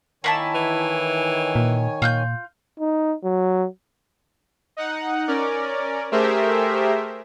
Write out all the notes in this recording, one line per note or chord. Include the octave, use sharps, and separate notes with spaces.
D#3 A#3 E4 C#5 G#5 A5
E3
A#2
A#2 F4 F#6 G6
D#4
F#3
D#4 F#5
C#4 A#4 D5
A3 G4 G#4 A#4 C5 E5